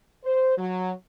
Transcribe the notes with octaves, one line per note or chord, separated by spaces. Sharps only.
C5
F#3